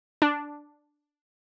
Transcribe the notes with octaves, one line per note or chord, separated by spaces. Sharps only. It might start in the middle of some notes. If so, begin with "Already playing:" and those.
D4